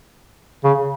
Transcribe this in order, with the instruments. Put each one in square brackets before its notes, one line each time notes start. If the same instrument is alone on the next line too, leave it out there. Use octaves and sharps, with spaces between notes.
[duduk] C#3